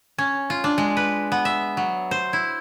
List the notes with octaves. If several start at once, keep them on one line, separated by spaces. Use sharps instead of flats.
C#4
F4
D4
G#3
B4
B3
E5
F#3
C5
E4